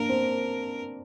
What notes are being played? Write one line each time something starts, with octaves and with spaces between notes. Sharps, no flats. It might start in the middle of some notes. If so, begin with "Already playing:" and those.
Already playing: A#3 D4 A#4
C4